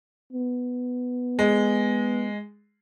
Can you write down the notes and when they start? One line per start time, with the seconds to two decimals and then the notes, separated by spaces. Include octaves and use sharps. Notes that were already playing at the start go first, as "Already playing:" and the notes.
0.33 B3
1.39 G#3